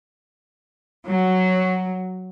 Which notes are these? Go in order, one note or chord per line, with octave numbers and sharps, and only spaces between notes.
F#3